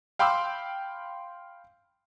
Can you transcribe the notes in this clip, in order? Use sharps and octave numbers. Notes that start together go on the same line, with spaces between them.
F5 G5 B5 C6 D6 E6